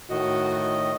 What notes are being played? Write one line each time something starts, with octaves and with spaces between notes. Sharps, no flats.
A2 D#3 F#4 D#5